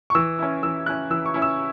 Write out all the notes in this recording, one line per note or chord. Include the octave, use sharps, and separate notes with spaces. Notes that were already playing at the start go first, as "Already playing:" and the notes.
C#6
E3 E6
C#4 E4
E3 E6
C#4 E4 F#6
E3 E6
C#6
C#4 E4
E6